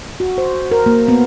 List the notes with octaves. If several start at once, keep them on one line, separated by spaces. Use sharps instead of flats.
F#4
C5
A#4
A#3
B3